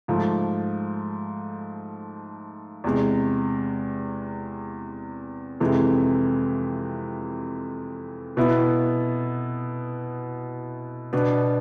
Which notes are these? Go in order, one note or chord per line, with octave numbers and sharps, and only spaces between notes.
G#2 F3 A3
E2 C3 G#3
F2 C3 E3 G#3
B2 B3 E4
B2 B3 D4